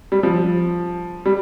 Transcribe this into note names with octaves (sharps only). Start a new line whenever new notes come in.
G3
F3
G3